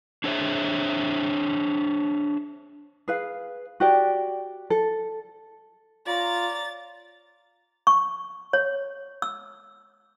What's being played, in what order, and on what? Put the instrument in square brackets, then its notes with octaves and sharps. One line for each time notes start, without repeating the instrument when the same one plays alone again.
[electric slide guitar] D4 G#4 C5 C#5 E5
[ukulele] G#4 B4 F5
F#4 G4 D5
A4
[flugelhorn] F4 [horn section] C#5 D5 A#5 [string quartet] A6
[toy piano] C#6
C#5
E6